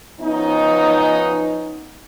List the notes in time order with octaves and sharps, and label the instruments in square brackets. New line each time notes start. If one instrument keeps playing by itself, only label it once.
[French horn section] F3 B3 C#4 D#4